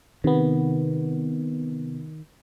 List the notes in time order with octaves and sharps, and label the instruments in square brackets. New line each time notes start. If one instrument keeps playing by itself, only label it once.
[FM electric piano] C3 B3 [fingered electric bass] D#3